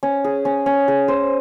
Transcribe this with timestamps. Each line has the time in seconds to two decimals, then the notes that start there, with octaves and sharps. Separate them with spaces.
0.03 C#4
0.24 G#4
0.45 C#4
0.66 C#4
0.88 G#4
1.08 C5